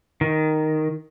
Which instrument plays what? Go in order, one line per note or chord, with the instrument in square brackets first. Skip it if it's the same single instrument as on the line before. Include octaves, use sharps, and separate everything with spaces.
[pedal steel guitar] D#3